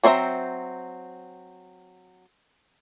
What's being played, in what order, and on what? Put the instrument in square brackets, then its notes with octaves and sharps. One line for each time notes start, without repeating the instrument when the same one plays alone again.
[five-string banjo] F#3 C4 C5 E5 A#5